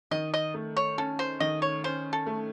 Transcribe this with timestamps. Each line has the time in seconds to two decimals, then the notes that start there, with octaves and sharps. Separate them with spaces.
0.11 D#3 D#5
0.34 D#5
0.54 A3
0.77 C#5
0.98 C#4 A4
1.19 C5
1.40 D#3 D#5
1.62 C#5
1.84 C#4 C5
2.13 A4
2.26 A3